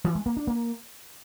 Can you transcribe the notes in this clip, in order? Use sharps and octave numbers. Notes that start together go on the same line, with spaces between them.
E3
G#3
A#3
D4
A#3